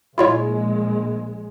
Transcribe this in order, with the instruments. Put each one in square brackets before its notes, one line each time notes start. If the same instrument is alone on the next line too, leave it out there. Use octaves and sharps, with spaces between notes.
[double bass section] A#1 G#3 [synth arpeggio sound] E4 F4 C#5